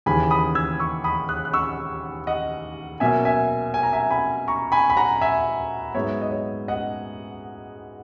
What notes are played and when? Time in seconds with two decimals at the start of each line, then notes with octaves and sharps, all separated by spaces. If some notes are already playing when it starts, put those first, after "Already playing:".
0.06 D#2 C#3 E3 G#5 B5
0.31 B5 D#6
0.55 E6 G#6
0.79 C#6 E6
1.04 B5 D#6
1.29 D#6 F#6
1.45 F#6
1.53 C#6 E6
2.27 D#5 F#5
3.00 B2 F#3 A#3 C#4 E5 G#5
3.25 E5 G#5
3.74 G#5
3.83 A#5
3.93 E5 G#5
4.11 G#5 B5
4.48 A#5 C#6
4.72 G#5 B5
4.90 B5
4.97 F#5 A#5
5.21 E5 G#5
5.95 G#2 F#3 B3 C#5 E5
6.21 D#5
6.32 C#5
6.68 D#5 F#5